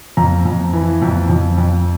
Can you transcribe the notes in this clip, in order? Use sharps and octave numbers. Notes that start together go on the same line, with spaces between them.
F2 A#5
F2
E3
F2
F2
F2